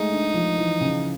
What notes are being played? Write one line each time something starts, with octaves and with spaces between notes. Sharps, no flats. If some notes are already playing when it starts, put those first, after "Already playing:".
Already playing: G#3 A3 D#4
D4
F3
E3
C#3